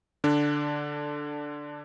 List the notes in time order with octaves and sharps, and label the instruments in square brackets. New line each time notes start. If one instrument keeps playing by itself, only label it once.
[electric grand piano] D3 D4